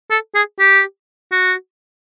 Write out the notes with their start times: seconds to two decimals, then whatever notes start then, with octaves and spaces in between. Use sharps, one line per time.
0.10 A4
0.35 G#4
0.59 G4
1.32 F#4